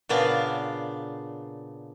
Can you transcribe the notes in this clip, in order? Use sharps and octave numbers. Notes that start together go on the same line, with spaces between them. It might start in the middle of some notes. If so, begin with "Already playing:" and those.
A#2 C#3 B3 D4 F5